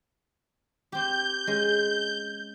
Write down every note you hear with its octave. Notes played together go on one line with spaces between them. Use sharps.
C4 G4 G6
G#3 C#4